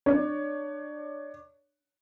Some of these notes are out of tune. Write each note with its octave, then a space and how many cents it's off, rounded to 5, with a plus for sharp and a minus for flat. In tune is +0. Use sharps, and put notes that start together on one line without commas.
D4 +25 C#5 +20